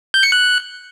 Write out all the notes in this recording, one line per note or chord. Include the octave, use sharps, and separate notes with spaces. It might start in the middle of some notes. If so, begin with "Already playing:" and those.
G6
C#7
F#6